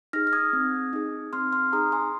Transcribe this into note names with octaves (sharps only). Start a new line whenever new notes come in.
D#4 G#4 F6 A#6
F6
D#6 G#6
C4
D#4 G#4
C4 C6 F6
C6 F6
D#4 G#4 A#5 D#6
G#5 C6